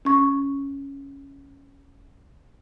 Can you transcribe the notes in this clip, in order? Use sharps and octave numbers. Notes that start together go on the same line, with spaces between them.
C#4 C#6